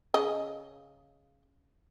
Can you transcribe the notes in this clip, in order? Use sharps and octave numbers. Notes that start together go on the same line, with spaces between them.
C#3 D#5